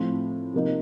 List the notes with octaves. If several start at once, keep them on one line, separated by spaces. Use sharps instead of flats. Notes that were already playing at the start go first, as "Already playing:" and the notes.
Already playing: A2 F3 C4
C3 F3 A#3 D#4